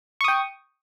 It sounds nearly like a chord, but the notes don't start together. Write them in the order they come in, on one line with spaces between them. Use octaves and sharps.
C#6 D#6 G5